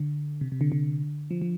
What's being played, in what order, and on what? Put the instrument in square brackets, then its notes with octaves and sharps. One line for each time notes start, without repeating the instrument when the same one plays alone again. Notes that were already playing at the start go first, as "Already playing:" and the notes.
Already playing: [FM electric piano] D3
C3
C3
D3
D3
F3
F3